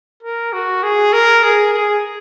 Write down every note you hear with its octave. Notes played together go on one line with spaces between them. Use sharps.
A#4
F#4
G#4
A#4
G#4
G#4